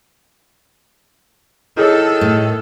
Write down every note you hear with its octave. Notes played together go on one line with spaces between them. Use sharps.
D#3 E4 G#4 A4 C#5
A2